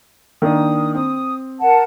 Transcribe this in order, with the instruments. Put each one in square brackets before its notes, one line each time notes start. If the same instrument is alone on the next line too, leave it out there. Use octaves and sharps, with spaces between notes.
[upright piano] D#3 A#3 D4 [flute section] D#6
[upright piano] C4 [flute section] D#6
[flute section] A#4 F#5 A5